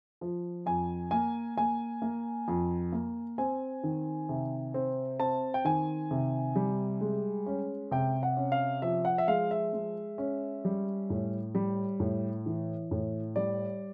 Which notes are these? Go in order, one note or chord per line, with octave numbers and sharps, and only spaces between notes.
F3
F2 G#5
A#3 G#5
A#3 G#5
A#3
F2
A#3
C4 G#5
D#3
C3
C4
C4 A5
G5
D#3 G#5
C3
G3
G#3
C#4
C3 G5
F#5
C#4
F5
F3 E5
F#5
E5
G#3 F5
E5
G#3
C#4
G3
A2
G3
A2
E3
A2
G3 D5